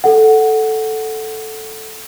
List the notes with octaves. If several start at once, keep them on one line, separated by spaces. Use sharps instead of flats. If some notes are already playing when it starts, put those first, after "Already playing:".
A4 F#5